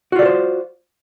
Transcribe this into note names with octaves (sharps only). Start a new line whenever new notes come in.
F4 F#4 A4 C5 D5